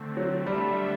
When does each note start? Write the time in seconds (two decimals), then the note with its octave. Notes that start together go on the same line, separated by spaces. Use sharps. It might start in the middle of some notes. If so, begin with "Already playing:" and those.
Already playing: D3 A3 C4
0.17 F#3
0.46 D3 G3 A3 D4 A4 E5